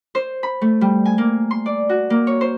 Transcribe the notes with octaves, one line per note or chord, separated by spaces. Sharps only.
C5
B5
A3
G3
G#5
A#3
C6
D5
F#4
A#3
C#5
C5